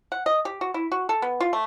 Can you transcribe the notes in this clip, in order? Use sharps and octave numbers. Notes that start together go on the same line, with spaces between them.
F#5
D#5
G4
F#4
E4
F#4
A4
B3
F4
A3